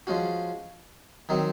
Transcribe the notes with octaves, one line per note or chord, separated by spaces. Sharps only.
F3 G#3 C#4 F#4
D#3 F#3 C4 D#4